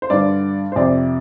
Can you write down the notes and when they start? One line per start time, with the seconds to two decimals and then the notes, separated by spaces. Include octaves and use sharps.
0.02 C5
0.10 G2 D3 D5
0.72 C5
0.76 F2 C3 D5